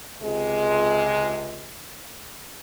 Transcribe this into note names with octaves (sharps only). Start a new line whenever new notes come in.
C#2 C3 G#3